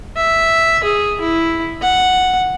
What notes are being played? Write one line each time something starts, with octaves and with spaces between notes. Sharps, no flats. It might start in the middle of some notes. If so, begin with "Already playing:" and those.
E5
G#4
E4
F#5